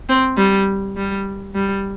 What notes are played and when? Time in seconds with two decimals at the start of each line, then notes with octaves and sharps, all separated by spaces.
0.09 C4
0.37 G3
0.97 G3
1.55 G3